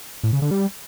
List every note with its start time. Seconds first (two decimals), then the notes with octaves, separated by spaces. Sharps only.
0.23 A2
0.33 C#3
0.42 D3
0.51 G3